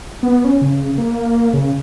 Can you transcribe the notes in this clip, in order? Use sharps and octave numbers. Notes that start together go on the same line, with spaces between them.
B3
C#4
C#3
A#3
C#3